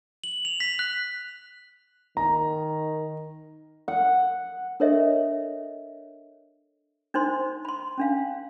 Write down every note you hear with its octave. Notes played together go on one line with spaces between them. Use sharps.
F#7
F7
B6
F#6
D#3 A#5
F#5
D4 A4 A#4 C#5 D#5 E5
D4 D#4 C5 C6
B5 C6
C#4 D4 F5